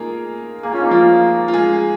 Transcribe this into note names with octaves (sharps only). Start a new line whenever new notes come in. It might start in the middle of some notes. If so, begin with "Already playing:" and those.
Already playing: A#3 D#4 F4 G#4 A#4
A#3 G#4
C#4 F4
A#3 D#4
F3 F4
F4
G#3 G#4